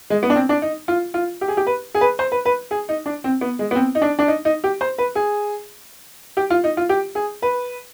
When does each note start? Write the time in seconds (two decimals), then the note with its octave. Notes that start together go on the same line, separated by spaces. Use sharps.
0.10 G#3
0.23 B3
0.30 D4
0.36 C4
0.49 D4
0.62 D#4
0.88 F4
1.14 F4
1.41 G4
1.48 G#4
1.57 G4
1.67 B4
1.95 G#4
2.01 B4
2.19 C5
2.32 B4
2.45 B4
2.71 G#4
2.89 D#4
3.06 D4
3.24 C4
3.41 B3
3.59 G#3
3.71 B3
3.75 C4
3.95 D#4
4.02 D4
4.19 D4
4.28 D#4
4.45 D#4
4.64 G4
4.81 C5
4.98 B4
5.15 G#4
6.37 G4
6.50 F4
6.64 D#4
6.77 F4
6.89 G4
7.15 G#4
7.42 B4